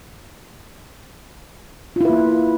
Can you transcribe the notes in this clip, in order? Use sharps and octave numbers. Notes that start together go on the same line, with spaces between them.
A#3 E4 F4 B4